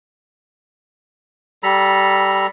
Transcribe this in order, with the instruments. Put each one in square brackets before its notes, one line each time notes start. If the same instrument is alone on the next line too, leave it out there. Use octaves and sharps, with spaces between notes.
[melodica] G3 A4 A#5 B5